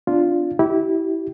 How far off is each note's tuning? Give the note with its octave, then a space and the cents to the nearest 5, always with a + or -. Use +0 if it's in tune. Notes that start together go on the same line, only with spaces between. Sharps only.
B3 +35 D4 +0 F4 -5
E4 -20 G4 -30